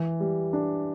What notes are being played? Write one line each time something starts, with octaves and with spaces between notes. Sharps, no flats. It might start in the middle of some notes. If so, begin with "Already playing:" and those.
Already playing: E3
G3
D4